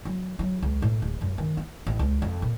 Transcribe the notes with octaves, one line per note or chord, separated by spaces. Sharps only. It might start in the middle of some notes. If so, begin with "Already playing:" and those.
F#3
F#3
C#2
A2
D1
F#2
D#3
D#4
A1
C#2
F2
A#2